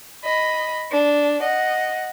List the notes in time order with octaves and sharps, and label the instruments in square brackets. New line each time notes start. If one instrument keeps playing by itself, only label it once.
[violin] D#5 B5
D4
D#5 F#5